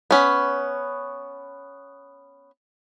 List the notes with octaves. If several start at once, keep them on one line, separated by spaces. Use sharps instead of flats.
B3 C#4